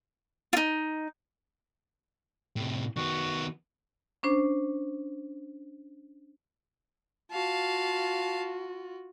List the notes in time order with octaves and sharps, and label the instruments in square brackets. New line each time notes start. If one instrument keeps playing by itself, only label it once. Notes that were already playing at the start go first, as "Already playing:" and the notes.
[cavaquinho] D#4 F4
[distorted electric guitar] A2 C3
[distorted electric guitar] D#3 B3 [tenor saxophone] F#4
[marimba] C#4 D4 C5
[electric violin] F4 F#4 [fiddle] F5 A5